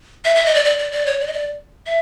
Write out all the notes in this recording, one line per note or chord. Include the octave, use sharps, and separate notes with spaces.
E5
E5
D#5
D5
D5
D5
D5
C#5
D5
D#5
D5
E5